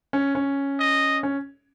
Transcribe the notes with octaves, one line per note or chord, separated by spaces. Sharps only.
C#4
C#4
D#5
C#4